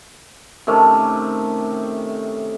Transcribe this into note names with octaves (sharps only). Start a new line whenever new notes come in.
C3 D#3 A3 C#4